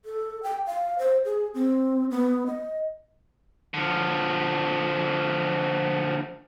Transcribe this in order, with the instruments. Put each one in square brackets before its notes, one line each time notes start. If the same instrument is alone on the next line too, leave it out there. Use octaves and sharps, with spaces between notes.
[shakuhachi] A4
G5
F5
C5
G#4
C4
B3
D#5
[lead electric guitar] D3 F3